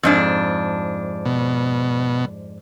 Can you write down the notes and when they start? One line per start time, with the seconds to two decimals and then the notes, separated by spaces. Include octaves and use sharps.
0.03 F2 G#2 D4
1.25 B2